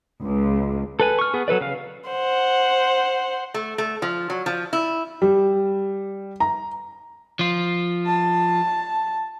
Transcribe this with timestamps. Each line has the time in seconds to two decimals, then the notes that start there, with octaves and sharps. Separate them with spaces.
0.23 C#2
1.00 A4 B4 G#5
1.19 C#6 F6
1.34 B3 G#4
1.48 F#3 A4 B4 D5
1.61 C#3 F5
2.09 C5 F#5
3.54 A3
3.78 A3
4.02 F3
4.30 F#3
4.46 F3
4.73 E4
5.22 G3
6.40 A#5
7.39 F3 F4
8.06 A5